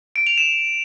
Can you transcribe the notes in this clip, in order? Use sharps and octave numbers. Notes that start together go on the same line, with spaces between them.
D7
F7
E7